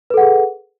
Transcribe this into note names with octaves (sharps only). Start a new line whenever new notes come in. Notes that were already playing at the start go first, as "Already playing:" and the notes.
G#4 A4 B4 F#5